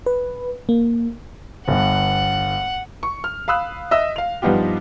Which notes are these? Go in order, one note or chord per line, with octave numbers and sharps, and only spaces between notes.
B4
A#3
G1 G2 F#5
C#6
F6
F5 B5 D#6 E6 F#6
D#5 E5 E6
F5 F7
G2 F3 B3 D#4 F4 G4